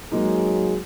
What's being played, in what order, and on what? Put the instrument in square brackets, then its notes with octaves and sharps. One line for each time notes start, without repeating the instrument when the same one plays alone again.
[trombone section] F#3 G#4 [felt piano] G#3 A#3 D#4